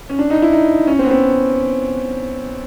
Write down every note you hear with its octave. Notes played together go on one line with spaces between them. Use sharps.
C#4
D4
D#4
E4
D#4
C#4
C4
B3
C4